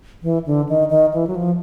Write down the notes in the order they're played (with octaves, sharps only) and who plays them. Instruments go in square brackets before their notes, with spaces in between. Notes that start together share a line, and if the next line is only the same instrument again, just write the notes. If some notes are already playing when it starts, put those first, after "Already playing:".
[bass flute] E3
D3
D#3
D#3
E3
F#3
F3